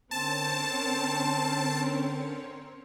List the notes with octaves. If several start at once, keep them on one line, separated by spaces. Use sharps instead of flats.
D3 C4 C#4 A#4 C5 C#5 A5